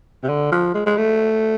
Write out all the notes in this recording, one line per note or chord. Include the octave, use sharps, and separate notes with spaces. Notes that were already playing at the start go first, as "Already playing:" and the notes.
C3
D3
F3
G#3
G#3
A3